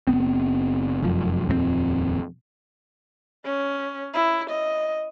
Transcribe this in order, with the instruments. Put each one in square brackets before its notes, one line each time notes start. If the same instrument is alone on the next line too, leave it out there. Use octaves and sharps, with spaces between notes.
[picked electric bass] F#1 G2 B3 C4
F1 F#2 F3
D#1 F2 G#3 C4
[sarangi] C#4
E4
D#5